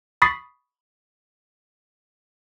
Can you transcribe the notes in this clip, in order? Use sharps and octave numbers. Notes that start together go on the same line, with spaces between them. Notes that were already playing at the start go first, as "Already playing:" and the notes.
B5 C#6 D#6 A6 B6 C7